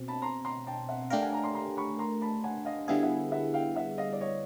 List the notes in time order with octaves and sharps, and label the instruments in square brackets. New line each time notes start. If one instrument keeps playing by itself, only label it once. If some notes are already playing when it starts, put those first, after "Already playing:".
Already playing: [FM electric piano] B2 C4
[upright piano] A5 B5
A#5 C6
A#5 C6
G5 A5
E5 F#5
[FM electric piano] A3 D4 G4 A#4 [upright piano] F5 G5
[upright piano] F#5 G#5
G#5 A#5
A#5 C6
A#5 C6
B5 C#6
A#5 C6
A5 B5
F#5 G#5
D#5 F5
[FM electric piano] D3 G3 B3 E4 G#4 [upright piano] F5 G5
[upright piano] E5 F#5
E5 F#5
F5 G5
E5 F#5
D#5 F5
D5
C#5 D#5